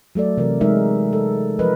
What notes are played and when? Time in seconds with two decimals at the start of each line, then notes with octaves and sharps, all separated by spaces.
0.15 F#3 A3 A4 D5
0.38 C3 E3 A#4
0.61 C3 G#3 D#4 A#4 E5
1.13 A4
1.59 F3 A#4 B4 D#5